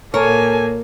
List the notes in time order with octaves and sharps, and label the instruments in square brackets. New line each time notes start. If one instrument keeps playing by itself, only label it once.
[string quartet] A#2 A#3 [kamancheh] A4 G#5 [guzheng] A#4 [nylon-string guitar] C#5